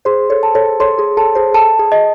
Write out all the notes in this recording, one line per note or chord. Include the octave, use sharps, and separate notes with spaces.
G#4 C5 C6
A4 C#5
A5
A4 C#5
A4 C#5 C6
G#4
A4 A5
G#4 C5
A4 A5
G#4
D#5